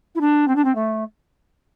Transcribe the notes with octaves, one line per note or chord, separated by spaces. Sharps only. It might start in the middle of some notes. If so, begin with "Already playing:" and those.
E4
D4
C4
D4
C4
A3